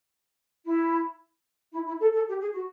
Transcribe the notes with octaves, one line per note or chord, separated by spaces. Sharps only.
E4
E4
E4
A4
A4
G4
G#4
F#4